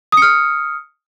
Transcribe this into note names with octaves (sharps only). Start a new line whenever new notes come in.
D#6 F6 C#7